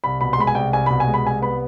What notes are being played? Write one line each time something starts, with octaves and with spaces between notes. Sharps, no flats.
C2 B5
B2 B5
C6
G#3 B5
G#5
C2 G5
C2 G#5
B2 B5
G#5
G#3
B5
C2 G#5
B3 B5